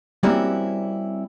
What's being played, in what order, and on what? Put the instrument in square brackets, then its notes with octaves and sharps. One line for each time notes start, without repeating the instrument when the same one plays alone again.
[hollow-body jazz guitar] G3 A#3 C4 C#4 E4 F#4